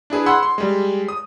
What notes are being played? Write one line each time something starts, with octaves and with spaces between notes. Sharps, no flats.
D4 E4 G#4 B4
F#5 B5 C6 E6 G#6
C6
G3 G#3
D#6